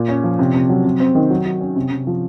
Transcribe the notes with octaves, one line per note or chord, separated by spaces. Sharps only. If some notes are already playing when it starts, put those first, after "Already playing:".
Already playing: A#2
C#4
F3
C3
C3
F#3
C3
C4
D#3
F#3
F#3
C#4
C3
C3
F3